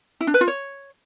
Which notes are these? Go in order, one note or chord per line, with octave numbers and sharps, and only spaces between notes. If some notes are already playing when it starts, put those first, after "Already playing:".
E4
D4
B4
F4
C#5